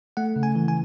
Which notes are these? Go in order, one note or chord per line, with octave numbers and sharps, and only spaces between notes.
A3 F#5
C#3
G#5
E3
G#5